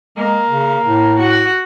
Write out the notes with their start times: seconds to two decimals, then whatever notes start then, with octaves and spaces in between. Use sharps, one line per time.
0.17 G#3 A#3
0.49 C#3
0.85 A2
1.19 F#4